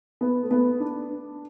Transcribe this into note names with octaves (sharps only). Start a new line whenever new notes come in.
B3
A3
B3
D4